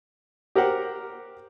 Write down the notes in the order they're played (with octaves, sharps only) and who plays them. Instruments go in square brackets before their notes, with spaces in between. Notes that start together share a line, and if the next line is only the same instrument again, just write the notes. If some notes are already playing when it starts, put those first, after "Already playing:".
[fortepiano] G4 A#4 C5 F#5